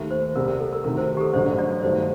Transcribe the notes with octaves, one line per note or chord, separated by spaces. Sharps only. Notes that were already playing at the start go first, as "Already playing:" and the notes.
Already playing: D#2 D#3 A3
C5
C2 C3 G3 A#4
A#4
A4
A#4
D2 C3 D#3 A#4
C5
G4
A4
A1 G2 D3 F#3 C5
D5
G1 G2 D#3 A3 C5